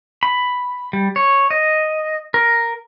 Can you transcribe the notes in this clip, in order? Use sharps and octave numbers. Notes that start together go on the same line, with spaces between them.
B5
G3
C#5
D#5
A#4